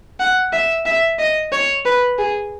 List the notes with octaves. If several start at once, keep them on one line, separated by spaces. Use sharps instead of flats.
F#5
E5
E5
D#5
C#5
B4
G#4